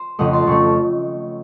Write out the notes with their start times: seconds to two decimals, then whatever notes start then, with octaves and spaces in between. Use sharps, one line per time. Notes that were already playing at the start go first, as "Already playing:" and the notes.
Already playing: C5
0.19 F2 C#3 A3 D#5 F#5
0.33 A5 C6
0.47 F2 C#3 A3 C#6